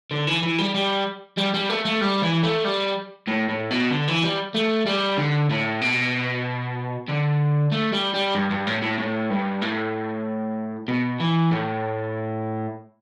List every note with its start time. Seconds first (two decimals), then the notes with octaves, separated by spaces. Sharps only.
0.11 D3
0.27 E3
0.43 E3
0.58 G3
0.74 G3
1.38 G3
1.54 G3
1.70 A3
1.85 A3
2.01 G3
2.22 E3
2.43 A3
2.65 G3
3.28 A2
3.49 A2
3.71 B2
3.91 D3
4.08 E3
4.23 G3
4.54 A3
4.86 G3
5.18 D3
5.50 A2
5.81 B2
7.09 D3
7.72 A3
7.93 G3
8.14 G3
8.35 G2
8.51 G2
8.67 A2
8.82 A2
8.99 A2
9.30 G2
9.62 A2
10.88 B2
11.20 E3
11.52 A2